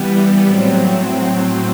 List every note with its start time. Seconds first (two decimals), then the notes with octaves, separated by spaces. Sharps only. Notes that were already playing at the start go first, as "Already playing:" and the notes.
Already playing: E3 G3 B3
0.45 A2 F#3 C4